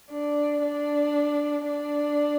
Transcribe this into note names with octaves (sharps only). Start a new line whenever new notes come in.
D4
D4
D4